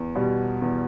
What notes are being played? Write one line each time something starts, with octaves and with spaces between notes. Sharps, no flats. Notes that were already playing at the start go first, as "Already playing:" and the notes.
Already playing: E2
B2 G3
E2